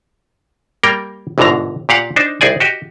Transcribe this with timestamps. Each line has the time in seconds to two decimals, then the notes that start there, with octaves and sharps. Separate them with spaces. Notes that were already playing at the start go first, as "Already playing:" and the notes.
0.83 G3 A#3 A#4 G5
1.38 G1 C2 G#2 B2 D3 A#5
1.89 A#2 G4 F5 F#5
2.16 D4 D#4 C5
2.41 C2 D#4 G#4 D5 G#5
2.60 F#4 G4 D#5